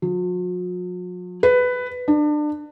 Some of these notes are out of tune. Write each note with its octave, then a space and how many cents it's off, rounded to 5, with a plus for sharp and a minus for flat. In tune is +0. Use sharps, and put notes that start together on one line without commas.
F#3 -45
B4 +10
D4 +30